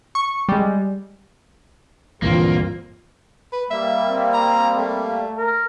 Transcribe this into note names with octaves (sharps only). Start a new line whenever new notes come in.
C#6
G3 G#3
D2 G2 A#2 E3 A#3 C4 F4
B4
G3 A#3 E5
C4
A#5
A3
A#4